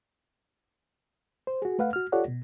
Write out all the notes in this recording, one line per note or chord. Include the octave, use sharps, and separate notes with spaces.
C5
F#4 G#4
A3 B4 F5 F#5
F#4 F6
F4 G4 A4 C#5 D5 F#5
B2